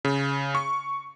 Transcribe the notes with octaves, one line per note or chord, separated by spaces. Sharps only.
C#3
C#6